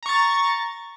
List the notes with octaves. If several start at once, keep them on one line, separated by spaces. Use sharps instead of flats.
A#5 C#6 A6